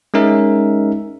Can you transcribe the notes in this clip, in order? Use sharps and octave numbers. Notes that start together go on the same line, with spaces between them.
G#3 C#4 D#4 A#4 E5